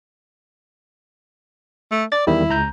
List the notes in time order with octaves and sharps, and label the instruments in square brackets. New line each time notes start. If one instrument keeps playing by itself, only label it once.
[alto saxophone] A3
[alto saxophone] D5 [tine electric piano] A6
[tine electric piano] E2 D#3 G3 [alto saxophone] E4
[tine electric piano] C#2 A#5 G6